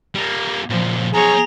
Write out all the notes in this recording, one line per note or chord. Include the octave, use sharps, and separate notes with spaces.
G3 A#3
A#2 C#3 F3
B1 G#4 C#5 A#5